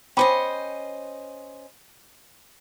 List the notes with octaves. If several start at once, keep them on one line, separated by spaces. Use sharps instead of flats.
C#4 C5 D#5 G5 B5 D6